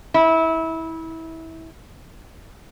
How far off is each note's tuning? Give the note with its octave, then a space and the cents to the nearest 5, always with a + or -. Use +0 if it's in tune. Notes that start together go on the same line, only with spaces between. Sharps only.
E4 -25